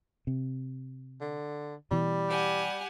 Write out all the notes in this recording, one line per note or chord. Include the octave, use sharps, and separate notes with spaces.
C3
D3
B2 E3 G3
G4 F#5 G#5